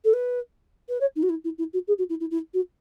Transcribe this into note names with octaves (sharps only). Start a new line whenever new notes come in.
A4
B4
B4
C#5
D#4
F#4
E4
E4
E4
F#4
G#4
F#4
E4
E4
E4
F#4